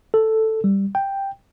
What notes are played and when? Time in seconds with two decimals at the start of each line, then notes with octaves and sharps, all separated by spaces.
0.14 A4
0.64 G3
0.95 G5